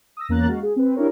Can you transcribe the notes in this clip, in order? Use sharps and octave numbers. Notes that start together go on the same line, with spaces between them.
D#6 E6 A#6
E2 A#3 C#4 A#5 F#6 A6
G#3 F#4 F5
G#4
C4 B4
D4 E4 G4 A#4 C#5